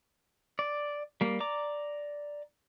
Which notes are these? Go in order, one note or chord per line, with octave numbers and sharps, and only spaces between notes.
D5
G3 A#3
D5 A#5 D6